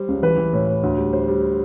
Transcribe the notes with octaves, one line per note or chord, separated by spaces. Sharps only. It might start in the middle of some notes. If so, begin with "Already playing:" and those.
Already playing: G3 C5
C#2
E3 B4
E3
A2
A2
D2
G3
G3 C5
G3